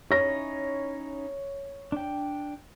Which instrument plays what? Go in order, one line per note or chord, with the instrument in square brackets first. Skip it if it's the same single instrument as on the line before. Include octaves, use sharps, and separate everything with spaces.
[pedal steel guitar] C#4 D#4 E4 [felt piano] C#5 A#6
[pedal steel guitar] D4 G5